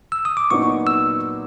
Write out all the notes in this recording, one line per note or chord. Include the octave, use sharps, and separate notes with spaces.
E6
D#6
D6
A#2 F#3 B3 D#4 C#6
E6